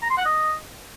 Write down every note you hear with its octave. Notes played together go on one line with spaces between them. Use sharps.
A#5
C6
F#5
D#5